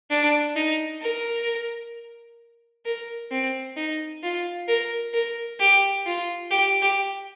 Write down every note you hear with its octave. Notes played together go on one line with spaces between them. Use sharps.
D4
D#4
A#4
A#4
C4
D#4
F4
A#4
A#4
G4
F4
G4
G4